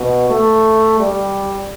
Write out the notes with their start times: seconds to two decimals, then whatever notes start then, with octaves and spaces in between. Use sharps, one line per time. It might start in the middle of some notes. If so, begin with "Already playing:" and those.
Already playing: B2
0.30 A3
0.99 G3